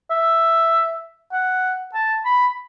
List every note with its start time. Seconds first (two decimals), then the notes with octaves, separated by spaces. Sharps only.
0.11 E5
1.33 F#5
1.94 A5
2.25 B5